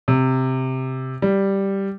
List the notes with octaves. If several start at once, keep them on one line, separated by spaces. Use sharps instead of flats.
C3
G3